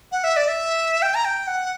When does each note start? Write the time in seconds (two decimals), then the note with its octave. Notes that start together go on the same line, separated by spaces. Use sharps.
0.12 F#5
0.24 E5
0.37 D5
0.48 E5
1.02 G5
1.15 A#5
1.25 G5
1.47 F#5